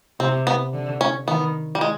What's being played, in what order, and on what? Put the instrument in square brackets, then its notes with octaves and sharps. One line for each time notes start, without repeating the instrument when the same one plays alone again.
[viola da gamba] C3 [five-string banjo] C4
[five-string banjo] B3
[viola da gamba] D3
[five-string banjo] C#4
[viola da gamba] D#3 [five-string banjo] B3
[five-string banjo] G3
G#3